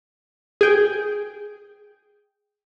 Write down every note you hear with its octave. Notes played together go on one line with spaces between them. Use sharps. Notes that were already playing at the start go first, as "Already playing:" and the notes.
G#4 G5